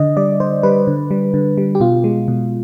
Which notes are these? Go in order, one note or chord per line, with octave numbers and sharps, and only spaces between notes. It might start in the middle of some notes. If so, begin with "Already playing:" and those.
Already playing: D3 D#5
G3 D5
D3 C5
G3 B4
D3
G3
D3
G3
G4
B2 F4
G#3
B2